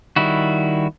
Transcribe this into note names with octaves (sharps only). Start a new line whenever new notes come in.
D#3 G3 E4 F#4